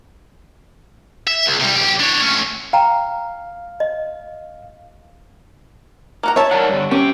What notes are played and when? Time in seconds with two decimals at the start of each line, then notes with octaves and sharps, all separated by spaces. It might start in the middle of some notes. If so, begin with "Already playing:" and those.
1.27 E5
1.46 C#2
1.60 C3 G3
1.75 B1 G4
2.00 D4 C#5
2.22 A3 C#4
2.73 F5 G5 A#5
3.80 D#5
6.23 A#3 F#4 A#5
6.36 C#5 E5 A5
6.51 F#3 A#4 D5 F#5
6.69 G2 D3
6.91 C4 C#4 G4